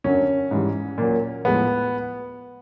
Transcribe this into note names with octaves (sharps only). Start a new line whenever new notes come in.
F#2 D3 F#3 C#4
G#2 E3 G3
A#2 F#3
A2 F3 G#3 B3